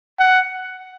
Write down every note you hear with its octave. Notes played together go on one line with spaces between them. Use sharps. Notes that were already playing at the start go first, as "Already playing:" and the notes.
F#5